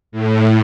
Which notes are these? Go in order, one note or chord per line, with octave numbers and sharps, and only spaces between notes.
A2